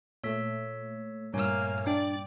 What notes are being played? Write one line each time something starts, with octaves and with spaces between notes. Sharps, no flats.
A#2 A3 C#5 E6 B6
G2 A#2 A3 A#3 C#5 G#5 F6
D4 D5 G5